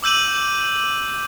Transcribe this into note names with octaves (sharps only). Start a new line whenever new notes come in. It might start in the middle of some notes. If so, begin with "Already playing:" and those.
D6 E6 G6 D#7 F#7